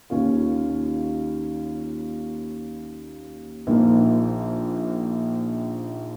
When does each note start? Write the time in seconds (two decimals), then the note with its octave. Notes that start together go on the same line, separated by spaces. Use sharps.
0.10 D#2 D#3 C#4 F4
3.67 A#1 A#2 F3 A#3 D#4